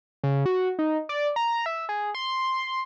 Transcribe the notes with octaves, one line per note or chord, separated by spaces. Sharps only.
C#3
F#4
D#4
D5
A#5
E5
G#4
C6